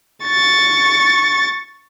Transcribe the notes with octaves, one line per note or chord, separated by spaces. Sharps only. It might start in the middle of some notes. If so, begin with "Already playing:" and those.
C#6 A6